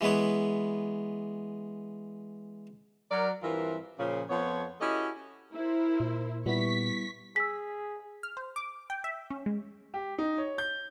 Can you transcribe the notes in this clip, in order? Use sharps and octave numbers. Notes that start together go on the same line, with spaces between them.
E3 G#3 B3 B4 C#5
F#3 A#4 D5
G2 E3 C4 F4 A#4 E5
A#2 C#3 F3
F2 F3 B3 C#5
C#4 E4 F#4 G4 A4 D#5
E4 A#4 C5
A#2
A#2 G3 B3 E4 C#6 B6
G#4 E6 B6
F6
C5
D6
G5
E5
C#4
G#3
G4
D#4
C#5
G6